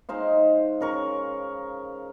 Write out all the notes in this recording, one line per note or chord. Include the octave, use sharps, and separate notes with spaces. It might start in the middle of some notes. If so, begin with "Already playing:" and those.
G#3 D#4 C5 F5
C#3 A#4 C#6